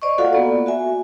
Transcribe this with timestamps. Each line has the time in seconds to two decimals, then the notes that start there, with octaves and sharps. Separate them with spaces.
0.02 C5 D5 D#5 C#6
0.18 A#3 F4 F#4 A4 F5 F#5
0.33 A#3 B3 D5
0.66 F#4 E5 G#5